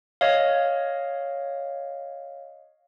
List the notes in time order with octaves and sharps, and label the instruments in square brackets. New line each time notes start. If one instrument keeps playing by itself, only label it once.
[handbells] C#5 D#5 F5